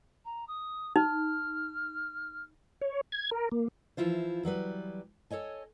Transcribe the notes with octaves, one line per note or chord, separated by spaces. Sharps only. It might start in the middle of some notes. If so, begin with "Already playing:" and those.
A#5
D#6
D#4 F6
C#5
G#6
A#4
A#3
E3 F3 E4 F4 C5
E3 F#3 G3 B4
A4 C#5 D#5 G#5